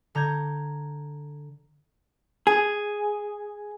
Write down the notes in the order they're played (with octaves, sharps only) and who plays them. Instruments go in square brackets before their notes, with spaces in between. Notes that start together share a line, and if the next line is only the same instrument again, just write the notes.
[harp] D3 A#5 G6 G#6
[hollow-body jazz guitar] G#4